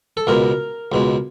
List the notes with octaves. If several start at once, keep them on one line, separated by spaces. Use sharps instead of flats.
A4
C#2 B2 G#3 A#4
C#2 B2 G#3